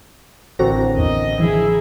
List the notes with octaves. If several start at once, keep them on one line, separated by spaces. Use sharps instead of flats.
A1 D3 C4 F#4 A4 A#4 A#5
E2 D#5
E3 F3 E4 G#4